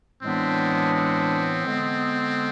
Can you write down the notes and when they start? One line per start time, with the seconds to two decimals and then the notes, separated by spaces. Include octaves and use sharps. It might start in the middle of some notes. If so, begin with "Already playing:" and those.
0.22 A2 E3 G#3 B3 C4 D4
0.94 C4
1.66 D3 G#3 B3